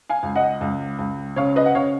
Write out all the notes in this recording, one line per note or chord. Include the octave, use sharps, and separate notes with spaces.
F5 G#5
C#2
D#5 F#5
C#2
C#2
C#3 C#5 F5
B4 D#5
F#5
C#3 C#5 F5